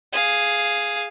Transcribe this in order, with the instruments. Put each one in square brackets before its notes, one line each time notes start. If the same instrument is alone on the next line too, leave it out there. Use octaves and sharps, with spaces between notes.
[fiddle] G#4 F5